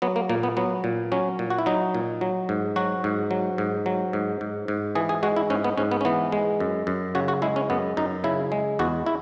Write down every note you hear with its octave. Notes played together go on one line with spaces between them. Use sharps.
F#3 B3
A#3
A#2 A#3
B3
F#3 B3
A#2
F#3 C#4
A#2
F#4
E4
F#3 D#4
A#2
F#3
G#2
F#3 F#4
G#2
F#3
G#2
F#3
G#2
G#2
G#2
E3 G#4
G#4
G#3 F#4
E4
G#2 C#4
B3
G#2 C#4
B3
C#4
E3 B3
G#3
F#2
F#2
C#3 F#4
F#4
G#3 E4
C#4
F#2 B3
F#2 D#4
C#3 E4
G#3
E2 F#4
E4